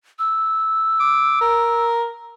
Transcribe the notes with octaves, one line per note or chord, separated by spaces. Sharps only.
E6
D6
A#4